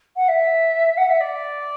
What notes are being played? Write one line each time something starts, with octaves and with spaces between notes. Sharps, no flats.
F#5
E5
F#5
E5
D5